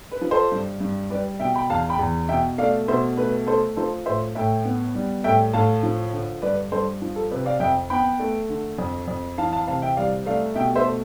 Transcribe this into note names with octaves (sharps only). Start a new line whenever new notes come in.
B4
F3
A4 C5
G2
G2
G3 B4 D5
B2 E5 G5
G5 B5
E2 F5 A5
G5 B5
E2
B2 E5 G5
A3 D5 F5
B2 C5 E5
A3 B4
A3 A4 C5
F3 A4 C5
A2 C5 E5
A2 E5 G5
B3
G3
A2 E5 G5
A2 F5 A5
F3
D3
G2 B4 D5
G2 A4 C5
F3
A4
C3 B4
D5 F5
F2 E5 G5
B3 G5 B5
A3
D3
F2
F2
E3 F5 A5
F5 A5
C3 F5 A5
E5 G5
C2 D5 F5
A3 D5 F5
B2 E5 G5
C5 E5
A3